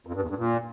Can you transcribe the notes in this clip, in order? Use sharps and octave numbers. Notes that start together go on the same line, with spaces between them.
F2
G2
E2
G2
A#2